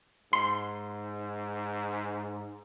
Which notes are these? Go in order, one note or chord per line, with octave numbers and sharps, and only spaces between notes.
G#2 C6